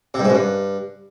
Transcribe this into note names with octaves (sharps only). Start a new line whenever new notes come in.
C3
G2
G#2
F#2
G2